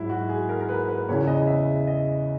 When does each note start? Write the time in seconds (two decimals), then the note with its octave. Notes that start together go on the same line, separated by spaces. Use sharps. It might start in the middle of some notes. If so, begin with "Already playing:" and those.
Already playing: G#2 F#3 E4
0.09 F#4
0.29 G#4
0.49 A#4
0.61 A#4
0.69 B4
0.89 B4
1.08 E2 C#3 E3 C#5
1.27 D#5
1.47 E5
1.87 D#5